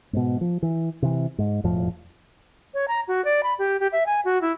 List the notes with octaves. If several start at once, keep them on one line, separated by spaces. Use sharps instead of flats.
G#2 B2
F3
E3
C3 E3
G#2
E1 F2 A2 F3
C#5
A#5
F#4
D5
B5
G4
G4
E5
G#5
F#4
E4